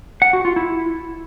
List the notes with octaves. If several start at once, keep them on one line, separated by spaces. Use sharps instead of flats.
F#5
F#4
F4
E4